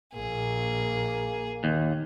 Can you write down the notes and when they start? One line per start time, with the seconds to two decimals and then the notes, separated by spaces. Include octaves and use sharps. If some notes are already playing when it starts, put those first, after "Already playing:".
0.14 A#1 A#3 G#4
1.64 D#2